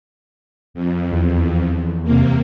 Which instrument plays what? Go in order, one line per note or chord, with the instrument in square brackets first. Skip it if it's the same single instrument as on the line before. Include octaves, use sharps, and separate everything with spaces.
[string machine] F2
[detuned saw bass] E2
[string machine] C3 A#3